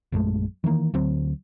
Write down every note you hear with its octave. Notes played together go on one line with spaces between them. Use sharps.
A#1 F#2 G#3 A3
D#3 E3 G3 A#3
D2 F#3 C4